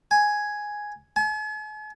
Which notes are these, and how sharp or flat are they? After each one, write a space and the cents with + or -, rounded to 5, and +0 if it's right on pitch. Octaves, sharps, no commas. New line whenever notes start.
G#5 +0
G#5 +45